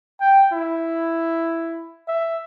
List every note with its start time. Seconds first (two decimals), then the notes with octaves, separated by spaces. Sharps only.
0.21 G5
0.53 E4
2.08 E5